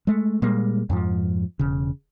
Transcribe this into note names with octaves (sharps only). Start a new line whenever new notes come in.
G#3 A3
A#2 G3 G#3 A#3
F2 G#2 F3
E1 C#3